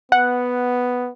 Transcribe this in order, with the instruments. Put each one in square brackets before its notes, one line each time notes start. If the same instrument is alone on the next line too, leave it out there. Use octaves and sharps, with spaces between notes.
[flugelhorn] B3 [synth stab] F#5